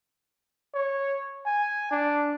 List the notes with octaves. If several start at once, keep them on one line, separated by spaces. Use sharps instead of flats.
C#5
G#5
D4